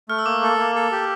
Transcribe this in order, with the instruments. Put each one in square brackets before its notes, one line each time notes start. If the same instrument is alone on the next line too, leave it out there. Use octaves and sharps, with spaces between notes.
[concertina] A3 [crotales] F6
[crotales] E6
[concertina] A#3 [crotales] D6
[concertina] A4
A#3
A4
G4